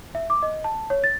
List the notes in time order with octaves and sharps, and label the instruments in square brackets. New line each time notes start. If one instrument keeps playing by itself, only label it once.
[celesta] E5
D6
D#5
A5
C#5
A6